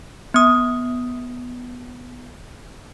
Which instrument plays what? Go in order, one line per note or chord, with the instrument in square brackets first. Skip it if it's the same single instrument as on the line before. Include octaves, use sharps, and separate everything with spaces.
[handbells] B3 D#6